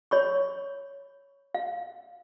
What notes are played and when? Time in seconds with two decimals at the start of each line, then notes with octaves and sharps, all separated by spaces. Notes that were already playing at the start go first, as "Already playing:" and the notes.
0.11 C#5 B5 C#6
1.54 F5